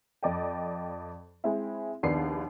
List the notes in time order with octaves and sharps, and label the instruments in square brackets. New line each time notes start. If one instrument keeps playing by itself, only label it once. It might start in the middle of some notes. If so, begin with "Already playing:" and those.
[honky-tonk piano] F2 D5 D#5 G5
G#3 C4 E4
A#1 D#2 B3 D4 D#4 C7